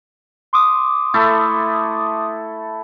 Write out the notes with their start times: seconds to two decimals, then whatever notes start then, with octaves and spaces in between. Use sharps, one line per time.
0.53 C6 D6 D#6
1.14 A3 E4 A4